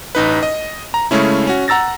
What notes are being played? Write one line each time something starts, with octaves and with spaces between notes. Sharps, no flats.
A1 D#4 B4
D#5
A#5
C#3 G#3 A3 C#4 E4
C#4 F#4
F#5 A#5 E6 A6 A#6